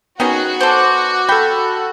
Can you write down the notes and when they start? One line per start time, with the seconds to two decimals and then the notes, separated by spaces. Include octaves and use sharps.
0.20 D#3 B3 C#4 F#4 G#4 D#5
0.61 A4 C5 D5
1.29 A4 G5 B5